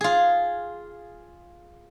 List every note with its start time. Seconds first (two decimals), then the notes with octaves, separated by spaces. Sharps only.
0.01 F4 G#4